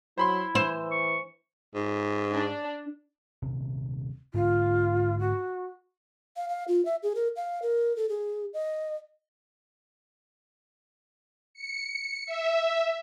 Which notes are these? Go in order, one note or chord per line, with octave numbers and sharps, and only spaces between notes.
F#3 E4 C5 B5 C6
E3 C5 E6
C#6
G#2
D4
D#1 C3
G#2 D3 A#3 F4
F#4
F5
F5
F4
E5
G#4
A#4
F5
A#4
A4
G#4
D#5
C#7
E5